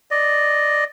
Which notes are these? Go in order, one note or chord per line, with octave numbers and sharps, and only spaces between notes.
D5 D#5